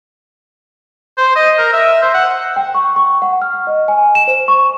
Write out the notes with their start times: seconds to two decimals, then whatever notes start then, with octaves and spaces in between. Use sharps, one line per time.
1.17 C5
1.35 D#5
1.58 A#4
1.73 E5
2.02 C5
2.14 F#5
2.56 G5
2.75 C#6
2.96 C#6
3.22 F#5
3.42 F6
3.67 D#5
3.88 G#5
4.15 E7
4.28 C5
4.48 C#6